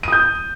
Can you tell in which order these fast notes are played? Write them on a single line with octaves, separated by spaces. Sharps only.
D#7 D#6 G6